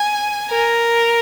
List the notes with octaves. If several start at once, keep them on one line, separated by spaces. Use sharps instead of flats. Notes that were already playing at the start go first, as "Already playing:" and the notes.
Already playing: G#5
A#4